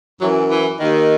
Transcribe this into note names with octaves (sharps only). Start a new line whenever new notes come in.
F#2 E3 F#3
E3
D#2 D#3